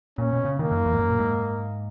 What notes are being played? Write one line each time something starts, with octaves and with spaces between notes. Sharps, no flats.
A#2 C#4
B2
C#3
D#3 A#3
F#2
E2
G#2
F#2
A#2
G#2